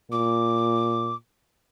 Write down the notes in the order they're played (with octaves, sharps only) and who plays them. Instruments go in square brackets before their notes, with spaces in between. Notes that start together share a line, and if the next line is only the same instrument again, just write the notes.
[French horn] A#2 [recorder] D6